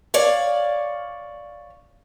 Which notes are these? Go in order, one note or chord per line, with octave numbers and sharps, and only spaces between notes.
C#5 D5 F5